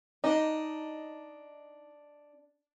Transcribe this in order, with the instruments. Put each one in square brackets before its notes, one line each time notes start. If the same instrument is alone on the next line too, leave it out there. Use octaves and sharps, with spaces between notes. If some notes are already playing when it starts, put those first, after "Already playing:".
[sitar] D4 D#5 [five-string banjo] D#4